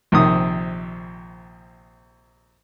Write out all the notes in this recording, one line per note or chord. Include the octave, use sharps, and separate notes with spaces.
A#1 C3 D#3 D#6